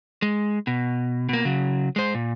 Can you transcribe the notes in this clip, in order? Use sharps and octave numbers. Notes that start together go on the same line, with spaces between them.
G#3
B2
B2 A#3
C#3 F#3
G#3 C5
A#2